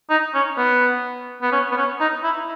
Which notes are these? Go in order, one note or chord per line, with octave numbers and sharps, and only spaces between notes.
D#4
C#4
B3
B3
C#4
B3
C#4
D#4
E4